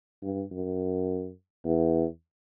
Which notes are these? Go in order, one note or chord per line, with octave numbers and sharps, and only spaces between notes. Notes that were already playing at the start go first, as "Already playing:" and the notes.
G2
F#2
E2